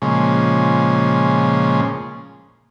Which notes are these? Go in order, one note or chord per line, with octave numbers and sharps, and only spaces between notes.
A#2 C#3 F3 G#3 C#4